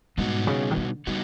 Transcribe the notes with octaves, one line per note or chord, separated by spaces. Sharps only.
G#2 B2 G3 B3 D#4 F#4
C#3
D#3
D3
C#3 G3 B3 D#4 F#4